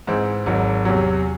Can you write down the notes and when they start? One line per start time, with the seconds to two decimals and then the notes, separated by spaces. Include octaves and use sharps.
0.07 G#2 E3 C4
0.46 G#1 G#2 F#3
0.85 E2 C3 F#3